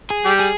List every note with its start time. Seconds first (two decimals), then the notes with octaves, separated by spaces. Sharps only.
0.10 G#4
0.25 G3 G4
0.40 G#4